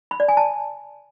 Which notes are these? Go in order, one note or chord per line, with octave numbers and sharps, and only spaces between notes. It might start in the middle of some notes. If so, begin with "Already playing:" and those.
B5
D5
G#5
A5